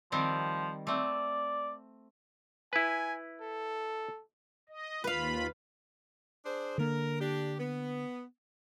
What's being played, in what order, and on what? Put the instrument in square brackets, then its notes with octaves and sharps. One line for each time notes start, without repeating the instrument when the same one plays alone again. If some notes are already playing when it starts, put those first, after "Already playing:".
[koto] D#3 G3 C4 [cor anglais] F3
[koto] A3 C4 [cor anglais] D5
[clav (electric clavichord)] E4 B4 [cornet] G#5
[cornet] A4
[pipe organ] D#5
[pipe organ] D#2 F4 B5 [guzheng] B4 F5
[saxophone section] D4 G#4 C5
[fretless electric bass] D3 A#3 [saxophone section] A#4
[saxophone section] D4 G4
B3